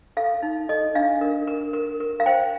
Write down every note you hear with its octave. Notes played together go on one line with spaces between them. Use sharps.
A4 F5
D#4
A4 D#5
D4 F5
A#4
A#4
A#4
A#4
F5
C5 G5